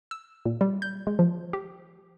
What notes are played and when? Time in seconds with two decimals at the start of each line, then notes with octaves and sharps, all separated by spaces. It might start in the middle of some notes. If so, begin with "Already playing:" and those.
0.11 E6
0.45 A#2
0.61 G3
0.82 G6
1.07 G#3
1.19 F3
1.53 G4